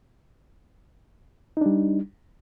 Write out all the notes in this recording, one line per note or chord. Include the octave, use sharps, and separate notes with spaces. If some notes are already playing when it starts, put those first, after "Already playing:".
G3 D4 D#4